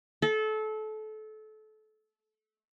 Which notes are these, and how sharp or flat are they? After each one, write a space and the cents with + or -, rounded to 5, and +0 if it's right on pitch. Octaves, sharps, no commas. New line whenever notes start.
A4 -25